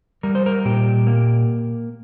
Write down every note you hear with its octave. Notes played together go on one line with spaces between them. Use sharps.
G3 A#4
C5
A#4
A#2 G4
A#3